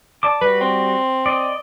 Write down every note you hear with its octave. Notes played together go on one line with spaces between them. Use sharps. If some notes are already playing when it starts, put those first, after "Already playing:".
D5 A5 D6
G3 F#4 B4
C4
D5 D#5